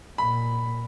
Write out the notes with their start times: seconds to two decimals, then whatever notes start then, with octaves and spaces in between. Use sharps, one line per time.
0.18 A#2 B5